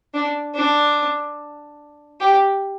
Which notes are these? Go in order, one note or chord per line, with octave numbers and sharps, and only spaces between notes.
D4
D4
G4